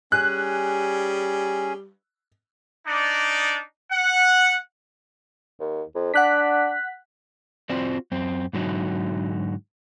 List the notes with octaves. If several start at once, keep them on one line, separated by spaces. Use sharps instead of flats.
G3 C#4 G#4 F#6
D4 D#4 D5
F#5
D#2
F2
D4 F#5 F#6 B6
C4 F4 F#4 C5 D5
F#2 C4
G#2 D3 F#3 D#4 F#4